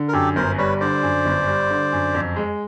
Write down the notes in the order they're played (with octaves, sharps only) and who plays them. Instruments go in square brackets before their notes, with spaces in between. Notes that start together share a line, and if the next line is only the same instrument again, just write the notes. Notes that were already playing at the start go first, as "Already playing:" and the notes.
Already playing: [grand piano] D3
[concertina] A#4
[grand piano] F#2 [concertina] G4 A4
[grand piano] G1 [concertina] A#4 C5
[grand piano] G3 [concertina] B4 C#5
[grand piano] D3 [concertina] C5 D5
[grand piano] F#2
G1
G3
D3
F#2
F2
G#3